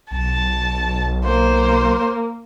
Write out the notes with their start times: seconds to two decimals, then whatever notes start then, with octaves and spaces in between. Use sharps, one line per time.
0.11 B1 A5
1.25 A#3 C5